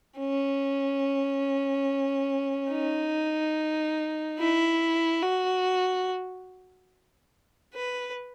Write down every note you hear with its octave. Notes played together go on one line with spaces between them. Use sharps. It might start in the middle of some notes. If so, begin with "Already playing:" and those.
C#4
D#4
E4
F#4
B4